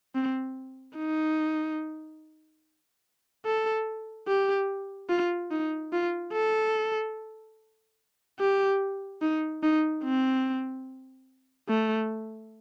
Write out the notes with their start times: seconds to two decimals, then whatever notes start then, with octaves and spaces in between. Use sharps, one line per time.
0.15 C4
0.97 D#4
3.45 A4
4.28 G4
5.09 F4
5.51 D#4
5.93 F4
6.33 A4
8.40 G4
9.22 D#4
9.63 D#4
10.04 C4
11.69 A3